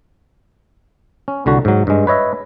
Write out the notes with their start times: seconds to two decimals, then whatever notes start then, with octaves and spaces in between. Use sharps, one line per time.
1.28 C#4
1.46 C2 D3 F#4
1.65 G#2 F#3
1.87 G2 G#3
2.07 B4 C#5 D#5 E5